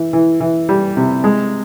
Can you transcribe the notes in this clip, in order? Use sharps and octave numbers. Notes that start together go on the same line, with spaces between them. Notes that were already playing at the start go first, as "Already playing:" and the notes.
Already playing: E3
E3
E3
G3
C3
G#3